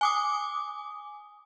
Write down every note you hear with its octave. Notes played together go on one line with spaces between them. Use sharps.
G#5 D6 D#6